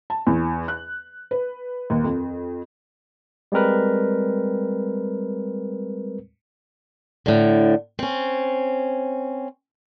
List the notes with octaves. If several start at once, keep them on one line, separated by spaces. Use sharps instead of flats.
A5
E2
F#6
B4
D#2
F2
G3 G#3 C4 A#4 B4
A2 D3
C4 C#4